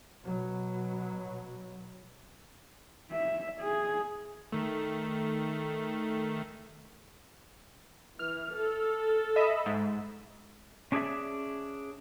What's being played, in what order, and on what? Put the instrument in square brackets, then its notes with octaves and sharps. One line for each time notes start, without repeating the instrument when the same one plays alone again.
[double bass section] B2 F#3
[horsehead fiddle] E5
G#4
[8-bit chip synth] D#3 A3
[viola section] E3 [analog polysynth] F6
[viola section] A4
[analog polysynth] D#5 E5 B5
G#2
[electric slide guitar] C#4 D4 G#4 C5 C#5 E5